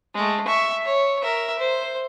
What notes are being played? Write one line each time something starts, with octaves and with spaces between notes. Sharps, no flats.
G#3 A3
E5 C#6
C#5
A#4 E5
C5